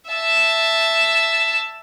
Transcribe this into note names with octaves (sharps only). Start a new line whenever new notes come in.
E5 A5